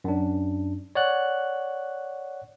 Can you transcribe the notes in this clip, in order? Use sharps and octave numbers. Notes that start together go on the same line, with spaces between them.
F#2 D4
C#5 D5 F#5 F#6